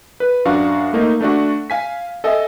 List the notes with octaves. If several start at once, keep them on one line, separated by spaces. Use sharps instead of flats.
B4
F#2 D4 F#4 F5
A3 A#3 D#4
A3 D4 F#4
F5 G#5 B6
A4 D#5 E5 G#5